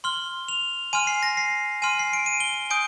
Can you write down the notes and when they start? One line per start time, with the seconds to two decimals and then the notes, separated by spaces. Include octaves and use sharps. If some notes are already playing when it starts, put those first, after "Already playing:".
0.04 C6 F6 G7
0.48 F7
0.93 G#5 C6 F6 D#7
1.07 C7
1.23 A#6
1.37 C7
1.82 G#5 C6 F6 D#7
1.99 C7
2.13 D7
2.26 D#7
2.40 G7
2.70 G#5 D#6 G6 D7